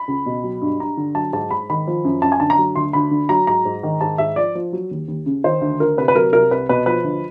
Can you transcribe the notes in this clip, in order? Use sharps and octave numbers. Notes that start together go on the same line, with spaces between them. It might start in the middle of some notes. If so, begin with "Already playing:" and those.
Already playing: B5
C#2
B2
F#3
G2
G2 A#5
D3
F#3 A5
G#2 A5
G#2 B5
D#3 B5
F3
F#2
F#2 A5
G#5
D3 A5
A#5
F#3
D2 C6
D2 B5
D3
F#3 A#5
G#2 A#5
G#2
D#3
G#2 A5
G#2 E5
F3 D5
F3
F#3
D#2
D#2
C#3
D#3 C5
D2
D2 A#4
C3 B4
B4
F#3 A#4
C2 A#4
C2 B4
B2 B4
F3 B4
D2